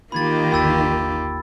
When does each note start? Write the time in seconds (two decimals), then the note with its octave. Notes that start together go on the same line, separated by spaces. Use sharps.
0.12 D#3 A#3 F4 G4 B5 G#6 A6
0.52 G1 D#2 G5 B5 E6 A6